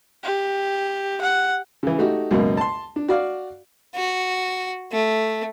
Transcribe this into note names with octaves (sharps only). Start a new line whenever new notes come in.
G4
F#5
C#3 E3
A3 D#4 F#4 G4
C#2 F#2 B2 A#3
A5 C6
D4
F#4 D5 F5
F#4
A3